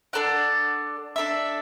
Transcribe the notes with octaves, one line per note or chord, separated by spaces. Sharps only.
D4 A4 D5 F#5
D4 A4 E5